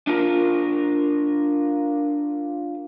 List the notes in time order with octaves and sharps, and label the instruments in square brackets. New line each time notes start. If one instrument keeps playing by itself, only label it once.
[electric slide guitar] D4 F4 A#4